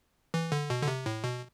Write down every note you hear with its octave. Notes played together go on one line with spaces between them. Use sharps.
E3
D3
B2
D3
C3
A2
B2